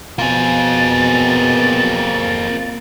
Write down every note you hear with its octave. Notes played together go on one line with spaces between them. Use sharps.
B2 A#3 C4 F4 G#4 A6